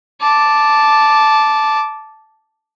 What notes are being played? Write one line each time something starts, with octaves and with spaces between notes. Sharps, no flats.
A5 D6